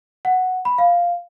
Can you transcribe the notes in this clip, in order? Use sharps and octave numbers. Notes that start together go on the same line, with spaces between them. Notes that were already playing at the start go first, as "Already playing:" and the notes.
F#5
B5
F5